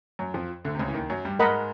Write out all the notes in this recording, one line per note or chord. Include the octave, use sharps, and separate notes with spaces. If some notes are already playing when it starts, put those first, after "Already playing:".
F#2 F#3
F2 F3
D2 D3
C3
C#2 C#3
E3
D#2 D#3
F#2 F#3
G2 G3
G#2 G#3 A#4 D#5 F#5 B5